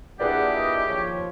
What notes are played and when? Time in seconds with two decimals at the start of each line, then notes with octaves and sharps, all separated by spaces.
0.20 A#2 D4 E4 G4 G#4 B4 D5 F#5
0.56 D#5
0.88 D#2 F3 C#5